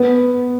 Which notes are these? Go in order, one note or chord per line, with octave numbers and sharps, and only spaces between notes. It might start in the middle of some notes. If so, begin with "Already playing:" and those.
Already playing: B3